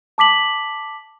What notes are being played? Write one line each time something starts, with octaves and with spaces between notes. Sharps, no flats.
A5 D6 B6 F#7